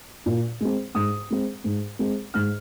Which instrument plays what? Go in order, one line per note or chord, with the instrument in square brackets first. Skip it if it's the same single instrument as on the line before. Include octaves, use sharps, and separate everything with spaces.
[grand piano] A#2
G#3 C4
G#2 D#6
G#3 C4
G#2
G#3 C4
G#2 F6